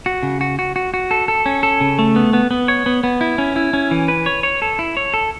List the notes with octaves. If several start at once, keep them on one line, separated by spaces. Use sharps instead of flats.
F#4
C#3
F#4
F#4
F#4
F#4
A4
A4
C#4
A4
C#3
A3
B3
B3
B3
C#5
B3
B3
E4
C#4
E4
C#4
E3
B4
C#5
C#5
A4
E4
C#5
A4